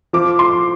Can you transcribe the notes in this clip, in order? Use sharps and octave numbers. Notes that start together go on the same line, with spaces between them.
F3 D6
C6